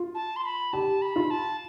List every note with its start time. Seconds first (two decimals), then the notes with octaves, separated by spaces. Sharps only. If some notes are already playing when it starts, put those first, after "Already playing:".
Already playing: F4
0.15 A5
0.36 C6
0.45 B5
0.73 G4 A5
1.02 B5
1.16 F4
1.30 A5